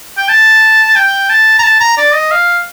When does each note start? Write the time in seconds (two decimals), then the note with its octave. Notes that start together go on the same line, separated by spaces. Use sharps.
0.17 G5
0.29 A5
0.95 G5
1.29 A5
1.59 A#5
1.63 A5
1.80 A#5
1.98 D5
2.14 D#5
2.31 F5